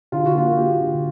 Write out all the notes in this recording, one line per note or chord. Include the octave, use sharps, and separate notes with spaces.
D3 F4
F#4
A#3 F4
A#3 G4
D3